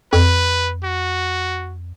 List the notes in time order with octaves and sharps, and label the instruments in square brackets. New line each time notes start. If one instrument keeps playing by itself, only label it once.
[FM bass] F2 [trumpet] B4
[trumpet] F#4